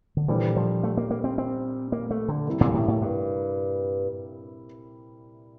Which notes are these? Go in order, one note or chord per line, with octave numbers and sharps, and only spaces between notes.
D3
A#2 E3 G3 D4 A4 C5
F3
A3
A#3
A#3
C4
C4
A#3
A3
D3
C3 G3 A#3 E4 A#4
A#2
A2
A2
G2